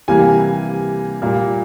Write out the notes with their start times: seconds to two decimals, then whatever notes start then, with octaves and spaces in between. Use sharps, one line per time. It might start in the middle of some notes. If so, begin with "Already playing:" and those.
0.08 C3 E3 G3 A#3 G#5
1.22 A#2 G3 A#3